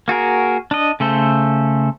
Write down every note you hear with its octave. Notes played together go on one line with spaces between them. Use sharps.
A#3 F#4 G#4 A#4
D4 D#5
C#3 A3 A4 C5